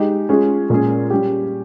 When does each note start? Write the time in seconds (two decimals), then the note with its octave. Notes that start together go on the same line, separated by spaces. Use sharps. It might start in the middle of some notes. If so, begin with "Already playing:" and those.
Already playing: G#3 D#4 G4
0.29 G#3 C#4 F4 G#4
0.70 A#2 G#3 C#4 G#4
1.10 G3 C#4 G4